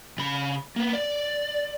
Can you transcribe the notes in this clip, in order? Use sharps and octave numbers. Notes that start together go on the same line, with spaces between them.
C#3 B5
A#3 B3
D5